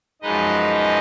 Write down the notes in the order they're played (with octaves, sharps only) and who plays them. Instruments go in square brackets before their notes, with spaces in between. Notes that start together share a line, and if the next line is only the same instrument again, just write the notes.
[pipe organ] F#2 F3 G#3 D#4 B4 D#5